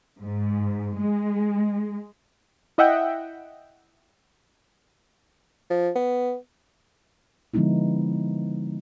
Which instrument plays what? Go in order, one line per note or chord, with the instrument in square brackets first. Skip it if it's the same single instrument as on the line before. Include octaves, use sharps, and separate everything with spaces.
[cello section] G#2
G#3
[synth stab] E4 D#5 E5 F#5 G5
[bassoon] F3
B3
[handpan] D3 F3 G#3 B3 D#4 E4